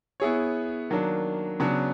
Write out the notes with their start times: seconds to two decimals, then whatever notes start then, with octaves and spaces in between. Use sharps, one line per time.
0.20 B3 E4 G#4 C#5
0.90 D#3 F#3 A#3 D4
1.60 C#3 F#3 B3 D4